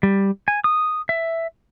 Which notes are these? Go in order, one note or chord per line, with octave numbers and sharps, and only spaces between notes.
G3
G#5
D#6
E5